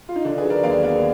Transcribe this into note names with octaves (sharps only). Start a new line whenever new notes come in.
F4
D#4
D3 D4
G#4 B4
F#3
A#4 D5
D#2 D5 F5
B3 A#4 D5